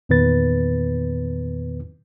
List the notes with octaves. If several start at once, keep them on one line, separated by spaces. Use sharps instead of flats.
E2 A#2 D#3 B3 B4 A6